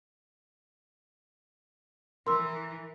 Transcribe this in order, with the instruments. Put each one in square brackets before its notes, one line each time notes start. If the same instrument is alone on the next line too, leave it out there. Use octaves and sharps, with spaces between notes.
[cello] E3 [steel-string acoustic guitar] A#4 [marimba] C6 E6